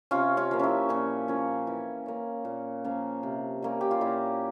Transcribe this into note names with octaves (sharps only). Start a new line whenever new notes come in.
C3 C#4 F4
C#4 F4
F3 A#3
C#4 E4
A#2 C#4
F3 A#3 C#4
E3
A#3 C#4
A#2
F3 A#3 C#4
C3
G3 A#3 C#4
G4
F4
A#2 E4